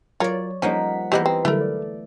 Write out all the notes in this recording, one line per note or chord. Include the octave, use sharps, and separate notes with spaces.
F#3 F4 A#4 C#5 D5
F3 G3 A#3 C#4 D#4 F#5 B6
E3 A#3 B3 G4 C5 D#5
C4 G4 D#5
D3 F#3 G3 A3 E4 A#4
D5